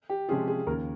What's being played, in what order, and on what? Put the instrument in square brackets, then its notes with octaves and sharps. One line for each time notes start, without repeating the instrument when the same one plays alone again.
[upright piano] G4
[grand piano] C3 F3 G#3 C#4 F4 [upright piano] G#4
[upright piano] G#4
[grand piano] D#2 C#3 F3 [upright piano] A#4